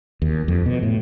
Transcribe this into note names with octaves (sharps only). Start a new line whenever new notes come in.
D#2
F2
B2
A2